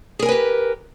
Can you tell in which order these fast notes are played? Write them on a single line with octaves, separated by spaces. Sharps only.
G#4 A#4 G#5 B4 G4